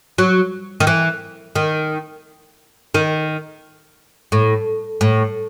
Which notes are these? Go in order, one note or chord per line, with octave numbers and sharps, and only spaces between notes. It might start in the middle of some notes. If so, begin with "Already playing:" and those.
F#3
D#3
E3
D#3
D#3
A2
A2